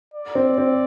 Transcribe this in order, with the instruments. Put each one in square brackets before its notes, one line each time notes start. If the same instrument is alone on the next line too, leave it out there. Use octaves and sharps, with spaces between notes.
[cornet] D5
[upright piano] C4
C4